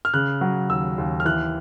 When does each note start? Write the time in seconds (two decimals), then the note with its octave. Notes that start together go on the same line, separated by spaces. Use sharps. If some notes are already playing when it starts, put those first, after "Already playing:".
0.05 F6
0.14 C#3 F#6
0.41 F#3
0.69 D#2 E6
0.98 D#2
1.20 F6
1.25 E3 F#6